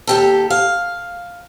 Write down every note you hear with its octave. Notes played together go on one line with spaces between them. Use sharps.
D#2 G4 A4
F5